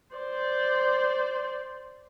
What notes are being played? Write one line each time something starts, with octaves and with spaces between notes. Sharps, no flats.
C5 D5